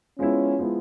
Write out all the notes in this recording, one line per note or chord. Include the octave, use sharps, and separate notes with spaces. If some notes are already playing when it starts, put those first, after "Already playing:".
F3 G#3 B3 C#4 E4
F3 G#3 B3 E4